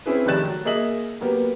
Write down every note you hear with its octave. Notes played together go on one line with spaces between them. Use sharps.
C4 C#4 E4 G#4 B4
F1 D#3 G4 F#6 A6 E7
F#3
A#3 G#4 D#5 E5 F#7
F#3 A#3 B3 G4